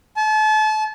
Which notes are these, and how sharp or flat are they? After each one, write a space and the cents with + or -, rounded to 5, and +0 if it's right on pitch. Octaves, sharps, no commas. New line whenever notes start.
A5 -35